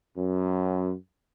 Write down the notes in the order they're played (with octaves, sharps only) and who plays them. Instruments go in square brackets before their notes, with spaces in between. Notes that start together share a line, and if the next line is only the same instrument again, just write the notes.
[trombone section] F#2